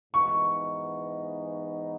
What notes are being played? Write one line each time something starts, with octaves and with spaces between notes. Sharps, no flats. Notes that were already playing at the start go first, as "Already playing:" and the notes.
G#2 E3 B3 D#4 C#6